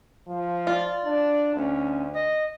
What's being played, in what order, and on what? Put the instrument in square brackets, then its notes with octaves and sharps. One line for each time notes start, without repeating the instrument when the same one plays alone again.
[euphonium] F3
[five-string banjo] F4 [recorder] D5
[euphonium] D4
[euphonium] D2 [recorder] C#4
[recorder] D#5